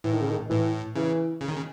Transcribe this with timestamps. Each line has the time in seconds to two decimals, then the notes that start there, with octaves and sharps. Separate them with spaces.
0.04 A2 E3
0.13 D#3
0.22 C#3
0.31 D#3
0.50 A2 E3
0.96 C#3 E3
1.41 C#3
1.48 D#3
1.56 C#3